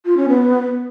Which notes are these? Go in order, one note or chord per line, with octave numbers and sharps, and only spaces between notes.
F4
C#4
B3